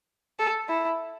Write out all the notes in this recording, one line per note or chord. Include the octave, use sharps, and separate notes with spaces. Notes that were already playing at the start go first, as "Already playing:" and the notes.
A4
E4